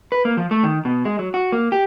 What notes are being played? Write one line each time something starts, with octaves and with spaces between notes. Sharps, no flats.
B4
A#3
F3
A3
D#3
B2
G#3
F#3
F#4
A#3
G4